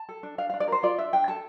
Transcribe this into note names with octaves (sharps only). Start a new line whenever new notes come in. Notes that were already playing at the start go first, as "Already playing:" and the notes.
Already playing: A5
A4
D4
D4 F5
D4 F5
D5
A#4 C5
F4 D5
D4 E5
D4 G5
A4 A5